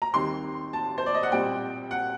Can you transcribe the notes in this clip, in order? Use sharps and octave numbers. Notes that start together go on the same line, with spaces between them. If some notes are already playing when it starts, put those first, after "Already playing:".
A#5
D#2 D#3 G3 C4 C6
A5
C5
D5
D#5
F#5
A#2 G3 C4 G5
F#5